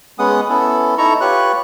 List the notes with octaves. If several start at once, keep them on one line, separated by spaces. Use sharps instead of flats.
G#3 B3 C#4 F#5 D#6
B3 C#4 E4 A4
D#4 E4 A4 A#5 C#6
F4 G4 B4 C#5 C#6 F#6